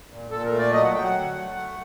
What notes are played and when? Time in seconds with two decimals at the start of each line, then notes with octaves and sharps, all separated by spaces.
0.10 A#2
0.31 A#2 A4
0.45 A#4
0.52 A3
0.59 D5
0.73 F#3 D#5
0.83 F#5
0.94 F#3 G5
1.04 F#5
1.15 D3
1.35 A3
1.56 A3